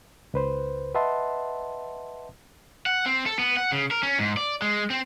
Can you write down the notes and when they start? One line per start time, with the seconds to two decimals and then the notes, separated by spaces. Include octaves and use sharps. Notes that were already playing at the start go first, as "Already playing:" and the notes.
0.34 C#2 B4 C5
0.94 B4 D#5 E5 F#5 A5 C6
2.86 F#5
3.06 C4
3.26 A4
3.39 B3
3.57 F#5
3.72 C#3
3.91 A#4
4.03 C#4
4.19 G#2
4.37 D5
4.62 G#3
4.90 C4